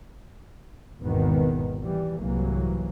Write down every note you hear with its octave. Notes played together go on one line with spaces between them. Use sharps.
G#1 E2 B2 D#3 B3
E3 G3
C2 G#2 E3 F#3 A#3